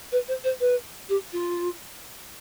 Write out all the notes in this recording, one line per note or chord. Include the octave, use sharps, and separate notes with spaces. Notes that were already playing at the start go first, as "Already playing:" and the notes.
B4
C5
C5
B4
G4
F4